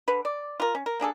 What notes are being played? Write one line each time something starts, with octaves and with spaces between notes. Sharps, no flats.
D3 B4
D5
F4 A#4
C#4
A#4
A#3 D4 G#4 A4